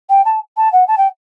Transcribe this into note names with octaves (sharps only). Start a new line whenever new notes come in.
G5
A5
A5
F#5
A5
G5